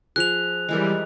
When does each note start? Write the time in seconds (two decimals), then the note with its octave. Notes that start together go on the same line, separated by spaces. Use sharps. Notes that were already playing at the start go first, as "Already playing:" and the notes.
0.16 F3 G#4 F#6 F7
0.69 E3 G3 G#3 G#4 A#4